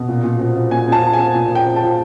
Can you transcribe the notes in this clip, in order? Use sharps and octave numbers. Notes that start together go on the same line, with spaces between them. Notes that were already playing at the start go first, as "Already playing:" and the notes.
Already playing: B2
A#2
A#2
F3
F3
A#2 G#5
F3 A5
F3
G#5
F3
A#2
F3
G5
F3
A5
F3